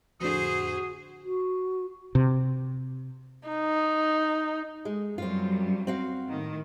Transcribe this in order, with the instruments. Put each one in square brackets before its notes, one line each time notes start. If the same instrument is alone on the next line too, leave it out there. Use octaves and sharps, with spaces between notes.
[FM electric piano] F2 A2 D3 [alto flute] F#4 [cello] G#4 C5 [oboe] D#6
[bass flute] F#4
[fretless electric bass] C3
[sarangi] D#4
[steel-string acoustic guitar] G#3
[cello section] F#2 F#3 G3 [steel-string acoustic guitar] C4 F4
[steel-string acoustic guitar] C4 F#4 F5
[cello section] A2 D#3